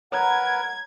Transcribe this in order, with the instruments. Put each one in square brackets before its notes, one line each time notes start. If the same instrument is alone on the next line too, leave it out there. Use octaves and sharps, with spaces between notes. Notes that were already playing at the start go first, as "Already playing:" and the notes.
[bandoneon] A#4 B4 [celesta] C#5 A#5 B5 [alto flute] F#5 [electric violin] G#6